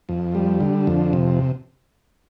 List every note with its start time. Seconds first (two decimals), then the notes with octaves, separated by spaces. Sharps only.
0.09 F2
0.35 G3
0.60 D3
0.87 F2
1.13 C3